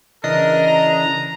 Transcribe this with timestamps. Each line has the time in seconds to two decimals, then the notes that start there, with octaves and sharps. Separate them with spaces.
0.24 C#3 E3 D4 A#4 D#5
0.67 A#5